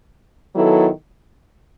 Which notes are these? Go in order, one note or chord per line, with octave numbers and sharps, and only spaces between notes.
D#3 F#3 B3 E4 A4